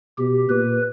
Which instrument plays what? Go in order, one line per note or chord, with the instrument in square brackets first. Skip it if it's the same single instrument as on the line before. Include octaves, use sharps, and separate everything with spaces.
[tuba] B2 [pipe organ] G4
[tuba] A#2 [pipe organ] B4